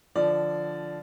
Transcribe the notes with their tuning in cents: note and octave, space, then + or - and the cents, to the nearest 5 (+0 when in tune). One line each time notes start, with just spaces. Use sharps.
D3 -10 F3 -10 D5 +0